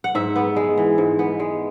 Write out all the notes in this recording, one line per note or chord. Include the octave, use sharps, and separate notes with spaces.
F#5
G#2 E5
B3
G#3
E3
G#2
B3
G#3